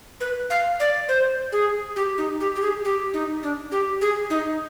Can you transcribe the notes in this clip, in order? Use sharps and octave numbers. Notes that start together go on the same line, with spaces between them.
B4
F5
D5
C5
G#4
G4
D#4
G4
G4
G#4
G4
D#4
D4
G4
G#4
D#4